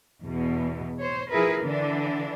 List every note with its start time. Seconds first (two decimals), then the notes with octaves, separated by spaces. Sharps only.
0.21 E2 B2
0.99 C5 C#5
1.31 F3 E4 G#4 A#4 B4
1.62 D3 E3 D4